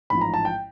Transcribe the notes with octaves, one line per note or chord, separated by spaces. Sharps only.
A1 G#2 F3 B5
A#5
A5
G5